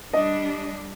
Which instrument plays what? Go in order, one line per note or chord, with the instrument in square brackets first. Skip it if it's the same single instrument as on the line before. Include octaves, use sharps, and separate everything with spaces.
[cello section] G3 D4 [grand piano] D#5